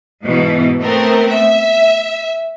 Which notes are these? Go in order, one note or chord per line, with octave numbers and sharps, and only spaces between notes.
G#2 B2 E3
A3 B3 C4 A#4
E5